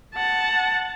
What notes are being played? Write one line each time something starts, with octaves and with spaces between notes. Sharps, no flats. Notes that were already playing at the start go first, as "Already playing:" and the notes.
F#5 A5